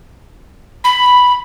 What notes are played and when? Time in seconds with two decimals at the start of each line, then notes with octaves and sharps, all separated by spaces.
0.84 B5